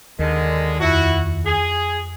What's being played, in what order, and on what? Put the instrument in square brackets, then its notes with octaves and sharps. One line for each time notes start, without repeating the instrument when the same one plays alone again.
[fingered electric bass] D#2 [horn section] D3 D#3 G#3
[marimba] F2 [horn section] E4 F#4
[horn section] G#4